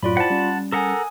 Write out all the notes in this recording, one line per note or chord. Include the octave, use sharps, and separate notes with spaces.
F#2 A2 F#3 F4 D5 B5
E4 C5 F#5 G5 A5
G3 C#4
A4 A#4 F#5 G#5 D#6